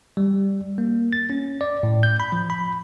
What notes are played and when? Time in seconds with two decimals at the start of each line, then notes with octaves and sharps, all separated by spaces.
0.17 G3
0.78 A#3
1.13 A6
1.30 C#4
1.61 D5
1.83 A2
2.03 G6
2.20 B5
2.32 F3
2.50 B5